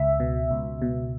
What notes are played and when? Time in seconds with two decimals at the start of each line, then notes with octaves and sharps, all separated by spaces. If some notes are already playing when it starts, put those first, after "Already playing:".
Already playing: C#2 E5
0.20 B2
0.51 C#2
0.82 B2